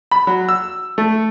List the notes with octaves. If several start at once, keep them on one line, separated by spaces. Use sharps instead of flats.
B5
F#3
E6
A3